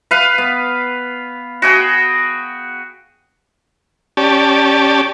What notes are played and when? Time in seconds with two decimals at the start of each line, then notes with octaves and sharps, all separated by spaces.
0.11 B4 F5
0.38 B3
1.62 F#4 G#4 G5
4.17 C#4 G4 D5 A5